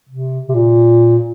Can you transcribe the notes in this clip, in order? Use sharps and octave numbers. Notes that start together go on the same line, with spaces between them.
C3
C3
A#2